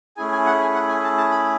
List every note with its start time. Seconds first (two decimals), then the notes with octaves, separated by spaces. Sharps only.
0.17 A3 C#4 E4 G#4 G#5
0.32 G#5
0.46 F#5
0.60 G#5
0.74 F#5
0.88 G#5
1.04 A5
1.18 A5
1.31 B5